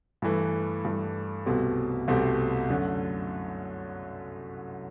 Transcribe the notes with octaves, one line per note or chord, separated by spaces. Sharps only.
G2 E3 A3
G2 E3 A3
C2 B2 A3 C4 G4
C2 B2 A3 C4 G4
F#2 D3 A3